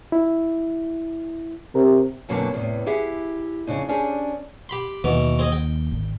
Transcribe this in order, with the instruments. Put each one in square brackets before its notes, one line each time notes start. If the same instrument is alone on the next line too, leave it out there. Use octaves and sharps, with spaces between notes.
[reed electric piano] E4
[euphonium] C3 [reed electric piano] A#4
[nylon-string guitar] F#2 B2 D3 F#3 A#3 C4
E2 A2 C3 B3
E4 G4 G#4 E5 F#5
F2 C#3 D4 D#4
C#4 D4 G4 G#4 C5 D5
[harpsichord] G4 B5 C6
[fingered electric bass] D#2 [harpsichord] B2 E3
[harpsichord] C4 G#4 D#5
G5
[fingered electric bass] G#1